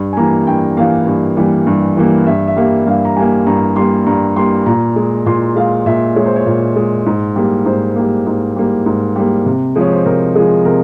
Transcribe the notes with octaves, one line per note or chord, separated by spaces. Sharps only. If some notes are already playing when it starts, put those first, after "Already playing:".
Already playing: G2
G#5
E3 G3 A#3 A#5
G2 G5
E3 G3 A#3 F5
G2
E3 G3 A#3
G2
E3 G3 A#3
G2 E5
E5
G3 A#3 F5
G2 F5
A#5
G3 A#3 G#5
G2 A#5
G3 A#3 C6
G2 A#5
G3 A#3 C6
A#2 A#5
G#3
A#2 C6
G#3 F5
A#2 E5
G#3 C#5
C5
C#5
A#2
G#3
G#2
G3 A#3
G#2 C5
G3 A#3
G#2
G3 A#3
G#2
G3 A#3
C3
F3 G#3
C#5
C5
C3 A#4
F3 G#3 G#4
C3 A#4